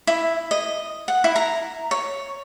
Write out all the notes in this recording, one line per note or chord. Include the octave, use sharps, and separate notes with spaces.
E4
D#5
F#5
E4
A#5
C#5